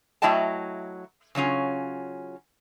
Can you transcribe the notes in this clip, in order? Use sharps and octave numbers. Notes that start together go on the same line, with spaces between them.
F#3 A3 E4 D#5 G5 A5
C#3 F#3 C#4 F4